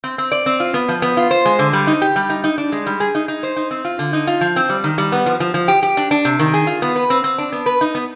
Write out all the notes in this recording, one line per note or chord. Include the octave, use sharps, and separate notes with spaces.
C4
C4
D5
C4
F4
B3
F3
B3
F4
C5
G#3
D3
G3
D#4
G4
G3
D#4
D#4
D4
G#3
G3
G#4
D#4
D#4
C5
D#4
C4
F4
D3
D#4
F4
F3
C4
G3
D#3
G3
B3
F3
F3
F3
G4
G4
D4
D4
C3
D#3
G#4
F4
B3
B4
C4
C4
D4
B3
B4
D#4
B3